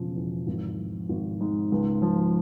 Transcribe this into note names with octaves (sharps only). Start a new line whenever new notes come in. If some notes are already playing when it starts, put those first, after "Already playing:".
Already playing: E1 C#3 F3
E2
G#1
F3
G#1
G#2
C#2
F3